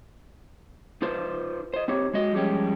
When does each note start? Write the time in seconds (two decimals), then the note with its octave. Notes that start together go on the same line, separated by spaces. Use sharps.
1.02 D#4 F4 B4 C5
1.74 C5 D#5
1.88 C4 D#4 G4 C#5
2.13 G#3 F#4 D#5
2.33 F3 G3 G#3 C#4 G4